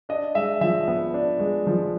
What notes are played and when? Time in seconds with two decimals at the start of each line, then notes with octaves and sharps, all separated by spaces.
0.09 D4 D#5
0.35 G#3 E5
0.61 F3 E5
0.88 B3
1.14 D4
1.40 G#3
1.67 F3